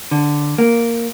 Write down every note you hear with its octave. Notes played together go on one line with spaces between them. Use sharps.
D3
A#3